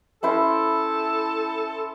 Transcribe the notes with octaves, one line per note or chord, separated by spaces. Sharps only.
C#4 E4 A4 C5